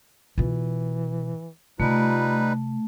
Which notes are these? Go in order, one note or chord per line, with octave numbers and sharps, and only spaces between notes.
B2 E3 F4
C3 G3 A3 D#4 F4 B4